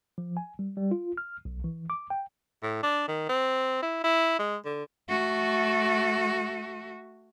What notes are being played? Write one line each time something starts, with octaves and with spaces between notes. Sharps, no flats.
F3
G#5
G3
G3
F4
F6
B1
E3
D6
G5
A2
D4
D#3
C4
E4
E4
G#3
D3
A3 F#4